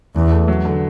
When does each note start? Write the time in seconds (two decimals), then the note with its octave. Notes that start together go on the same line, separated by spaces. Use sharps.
0.15 E2 E3
0.31 A3
0.48 F#3
0.65 D3